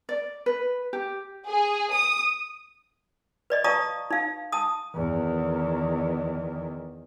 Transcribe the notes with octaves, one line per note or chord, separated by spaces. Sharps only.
D5
B4
G4
G#4
D#6
B4 D5 D#5
D5 F5 A5 A#5 C#6 D#6
D#4 F5
A5 D#6
E2 D#3